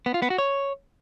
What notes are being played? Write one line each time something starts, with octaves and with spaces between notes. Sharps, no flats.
B3
F4
B3
F#4
C#5